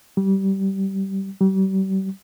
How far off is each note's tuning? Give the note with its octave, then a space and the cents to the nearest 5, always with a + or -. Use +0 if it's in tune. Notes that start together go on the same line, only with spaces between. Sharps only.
G3 -20
G3 -40